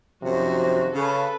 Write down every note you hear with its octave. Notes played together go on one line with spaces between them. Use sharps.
F#2 C3 D#3 F3 F#4
C#3 A4 B4